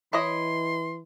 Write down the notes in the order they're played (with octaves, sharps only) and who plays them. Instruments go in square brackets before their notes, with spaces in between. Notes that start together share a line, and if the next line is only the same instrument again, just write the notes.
[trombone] E3 [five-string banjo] E4 C#5 D#5 [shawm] C6